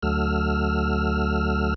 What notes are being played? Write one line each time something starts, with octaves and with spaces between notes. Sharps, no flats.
D2 F#3 A3 E6 F6